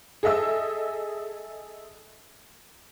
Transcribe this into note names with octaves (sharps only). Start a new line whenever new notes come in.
G#4 A4 D#5 E5 E6